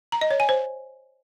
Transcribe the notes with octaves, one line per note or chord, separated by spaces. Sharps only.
A#5
D#5
C#5
G#5
C5